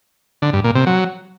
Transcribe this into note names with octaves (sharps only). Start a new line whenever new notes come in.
D3
G2
A#2
C3
F#3